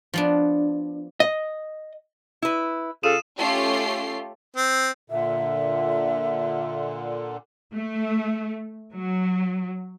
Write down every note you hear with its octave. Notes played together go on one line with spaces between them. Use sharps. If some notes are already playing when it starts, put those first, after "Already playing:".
F3 B3 D4
D#5
E4 B4
C#3 F4 A4 D#6 D#7 E7
A3 C#4 F4 G4 C7
C4
A#2 D3 E5
A3
F#3